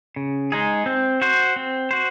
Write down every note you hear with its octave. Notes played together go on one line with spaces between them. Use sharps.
C#3
G#3 D#4 G#4
C4
F#4 C5
C4
F#4 C5